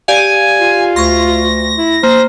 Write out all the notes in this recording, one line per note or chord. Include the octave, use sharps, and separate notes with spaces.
G4 D5 F5 G#5
F4
D2 C6 C#6 A#6
E4
A#3 C5